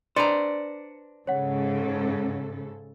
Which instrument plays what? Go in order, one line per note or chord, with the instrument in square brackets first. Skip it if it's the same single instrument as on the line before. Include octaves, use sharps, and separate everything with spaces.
[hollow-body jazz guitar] D4 B4 C5 [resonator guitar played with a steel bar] D5 A#5 [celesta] C#7
[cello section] G#2 C#3 A4 [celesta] C#5 F#5